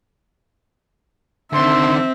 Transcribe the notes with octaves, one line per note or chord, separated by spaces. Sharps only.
D3 D#3 C4 E5 C6